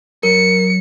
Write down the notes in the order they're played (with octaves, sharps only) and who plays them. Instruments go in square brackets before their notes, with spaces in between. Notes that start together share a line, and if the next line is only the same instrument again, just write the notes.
[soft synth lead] F#3 [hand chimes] A#4 [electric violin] C#7